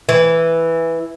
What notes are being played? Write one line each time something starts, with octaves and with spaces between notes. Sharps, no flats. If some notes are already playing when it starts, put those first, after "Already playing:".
E3